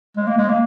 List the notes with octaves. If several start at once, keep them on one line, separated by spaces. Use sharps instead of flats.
G#3
A#3
G#3
A#3